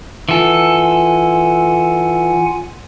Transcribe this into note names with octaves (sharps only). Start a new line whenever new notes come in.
E3 F4 A4 F#5 G#5